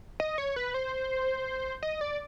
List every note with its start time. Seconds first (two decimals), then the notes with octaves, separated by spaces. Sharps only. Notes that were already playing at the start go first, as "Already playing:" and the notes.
0.20 D#5
0.38 C#5
0.56 B4
0.74 C5
1.83 D#5
2.01 D5